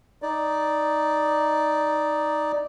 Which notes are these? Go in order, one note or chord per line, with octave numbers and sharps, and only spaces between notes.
D#4 D5